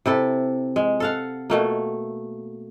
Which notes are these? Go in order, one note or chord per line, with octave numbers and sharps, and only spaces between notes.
C3 E4 A4
G#3
A4 F5 F#5
B2 A3 A#3